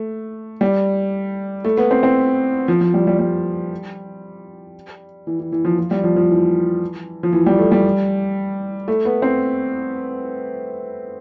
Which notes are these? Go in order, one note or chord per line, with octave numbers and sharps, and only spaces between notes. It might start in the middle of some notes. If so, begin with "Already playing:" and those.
Already playing: A3
G3
A3
B3
C4
C4
F3
F3
G3
G3
G3
E3
E3
E3
F3
F3
G3
F3
F3
E3
F3
E3
G3
A3
G3
A3
B3
C4